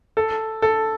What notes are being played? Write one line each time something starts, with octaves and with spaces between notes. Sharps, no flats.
A4
A4